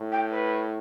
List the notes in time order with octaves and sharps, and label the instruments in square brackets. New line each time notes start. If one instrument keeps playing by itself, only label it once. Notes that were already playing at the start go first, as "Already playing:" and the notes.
Already playing: [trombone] A2
[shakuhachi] G5
B4